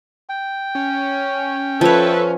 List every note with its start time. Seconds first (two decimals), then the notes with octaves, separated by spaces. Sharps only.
0.29 G5
0.75 C#4
1.81 F3 A4 B4 C#5 E5